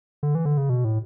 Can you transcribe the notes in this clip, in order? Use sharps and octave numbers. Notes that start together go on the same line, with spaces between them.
D3
E3
D3
C#3
B2
A2